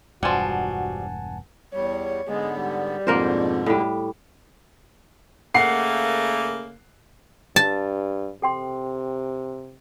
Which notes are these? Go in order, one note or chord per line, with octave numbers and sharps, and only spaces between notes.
E1 G2 F3 G3 F#4 F#5 G#5 A5
E2 G3 C#5
G#2 D3 G#3 B3
G3
F2 G#2 B2 D3 A#3 A#4 C5
A2 G3
C#3 A3 A#3 F#5 C7
G2 A5
C3 A4 G5 C6